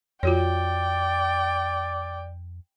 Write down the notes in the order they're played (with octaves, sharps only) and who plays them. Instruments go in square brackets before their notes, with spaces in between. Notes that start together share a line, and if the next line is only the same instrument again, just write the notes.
[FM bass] F2 [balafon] F4 F#4 C#5 [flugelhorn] D5 [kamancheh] G5